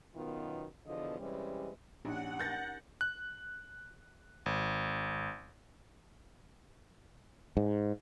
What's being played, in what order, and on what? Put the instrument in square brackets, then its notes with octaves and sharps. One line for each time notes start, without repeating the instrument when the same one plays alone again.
[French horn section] F#2 B2 D#3 B3 F4
E2 B2 D3 F3 D#5
C3 E3 G3 G#3 C#4
[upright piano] A#1 [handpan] C#4 D#4 G4 [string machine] F#5
[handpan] A#4 [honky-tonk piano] G6 A6 A#6
[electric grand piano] F#6
G#1
[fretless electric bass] G#2